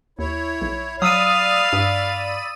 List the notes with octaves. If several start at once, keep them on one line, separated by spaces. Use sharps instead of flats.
D#2 E4 C#5
B1
F#3 D5 F5 B5 D#6 E6 D#7
G2